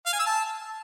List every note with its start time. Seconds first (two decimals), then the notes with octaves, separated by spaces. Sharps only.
0.06 F5
0.13 G#5
0.20 E6
0.26 A5